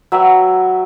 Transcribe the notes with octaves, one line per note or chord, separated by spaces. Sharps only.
F#3 B4 E5 G5